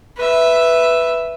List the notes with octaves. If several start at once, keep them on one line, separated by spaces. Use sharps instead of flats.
B4 E5